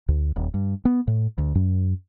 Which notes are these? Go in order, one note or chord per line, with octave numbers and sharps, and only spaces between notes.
D2
D#1
G2
B3
A2
D2
F#2